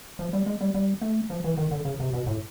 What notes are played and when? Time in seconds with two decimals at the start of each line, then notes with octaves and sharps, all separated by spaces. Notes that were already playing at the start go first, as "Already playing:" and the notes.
0.19 F3
0.33 G3
0.46 G#3
0.61 G3
0.74 G3
1.01 A3
1.30 F3
1.44 E3
1.57 D#3
1.71 D3
1.85 C#3
2.00 C3
2.13 B2
2.26 A2